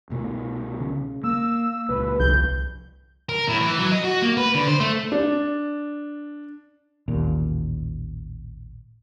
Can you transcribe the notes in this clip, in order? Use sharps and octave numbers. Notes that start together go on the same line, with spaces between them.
C2 B2 A3
C#3
A#3 E6
C#2 A#2 B4
G1 C2 F3 G6
A#4
A2
E3
F#3
D#5
F#4
A#3
B4
D3
C5
A3
D4
A1 D#2 A#2